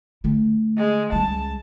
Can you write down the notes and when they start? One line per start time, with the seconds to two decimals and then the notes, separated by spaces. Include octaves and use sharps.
0.24 D3 A3
0.77 G#3
1.12 C#2 G3 A5